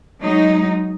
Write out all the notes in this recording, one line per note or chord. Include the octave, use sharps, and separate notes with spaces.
F#3 G#3 D#4